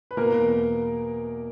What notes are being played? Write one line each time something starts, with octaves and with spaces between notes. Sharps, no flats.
B4
B2 A#3 A#4
E2